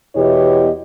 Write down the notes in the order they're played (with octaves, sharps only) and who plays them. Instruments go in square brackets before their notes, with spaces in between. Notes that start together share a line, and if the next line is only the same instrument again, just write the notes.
[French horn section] E2 B2 E4 G4 C#5 D#5